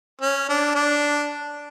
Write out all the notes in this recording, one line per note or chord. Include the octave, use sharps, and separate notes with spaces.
C#4
D4
D4